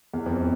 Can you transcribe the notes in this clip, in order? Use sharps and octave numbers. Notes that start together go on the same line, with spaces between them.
E2
F2